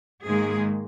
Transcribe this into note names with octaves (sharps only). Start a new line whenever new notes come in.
G#2 D#3 G#3 A#3 G#4